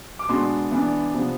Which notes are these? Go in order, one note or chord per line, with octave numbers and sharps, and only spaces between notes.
D6
B2 G#3 B3 D4 C6
E3 B3 D4
C3 F3 B3